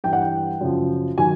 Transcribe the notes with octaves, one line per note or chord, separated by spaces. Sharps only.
G2 E3 G3 G5
F#5
G5
F#2 C#3 F3
D#3 F#3 G#5